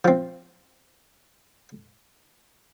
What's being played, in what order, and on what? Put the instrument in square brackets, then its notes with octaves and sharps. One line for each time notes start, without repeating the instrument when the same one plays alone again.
[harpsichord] F3 C4